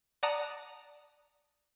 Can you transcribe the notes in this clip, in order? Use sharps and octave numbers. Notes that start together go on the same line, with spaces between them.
D5 F#5 A5 A#5 D#6